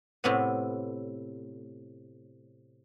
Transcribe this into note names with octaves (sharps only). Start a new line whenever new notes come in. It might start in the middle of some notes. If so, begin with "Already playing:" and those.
A2 C3 B3